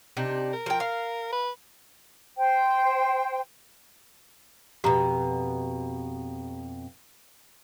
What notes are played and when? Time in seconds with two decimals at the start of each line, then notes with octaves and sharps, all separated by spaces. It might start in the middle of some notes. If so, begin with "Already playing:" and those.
0.17 C3 D4 D#4
0.53 A#4
0.66 F3 G5
0.80 F5
1.32 B4
2.37 C5 G5
4.84 F2 B2 G4 A#5